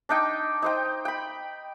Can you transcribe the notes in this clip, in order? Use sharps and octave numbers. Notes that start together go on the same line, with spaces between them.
D4 D#4 G5
D#4 C5 G5
G5 B5